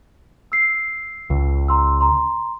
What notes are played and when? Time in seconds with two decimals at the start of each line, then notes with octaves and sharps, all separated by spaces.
0.52 E6 C7
1.30 C#2
1.68 A#5 C6 E6
2.01 A#5 C6